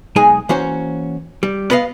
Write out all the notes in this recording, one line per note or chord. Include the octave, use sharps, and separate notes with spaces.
B1 G#3 D#4 G#4 G#5
E3 A#3 C#4 F#4 C5 C#5
G3
B3 B4 D#5 F5